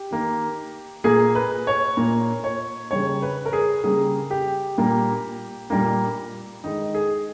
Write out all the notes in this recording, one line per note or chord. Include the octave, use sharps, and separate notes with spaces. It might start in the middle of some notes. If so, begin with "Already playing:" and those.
Already playing: G4
D#3 A#3
A#2 A#3 G#4
B4
C#5
A#2 A#3
C#5
C#3 G3 A#3 C#5
B4
A#4
G#4
C#3 G3 A#3 G#4
G4
A#2 G3 A#3
A#2 G3 A#3
D#3 G#3 D#4
G#4